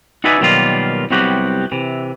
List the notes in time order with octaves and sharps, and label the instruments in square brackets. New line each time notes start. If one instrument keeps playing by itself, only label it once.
[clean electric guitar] D#4 F#4 B4 D5 E5 G#5
B2 D#3 F#3 G3 A#3 F4
C2 C3 F#3 B3 F#4 G4
C3 E3